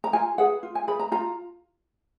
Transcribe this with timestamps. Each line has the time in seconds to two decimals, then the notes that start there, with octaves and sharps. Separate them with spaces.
0.04 A#5
0.13 F4 G#5
0.38 G#4 B4 F#5
0.63 F4
0.75 G#5
0.87 G#4 B4 B5
0.99 A#5
1.12 F4 A#5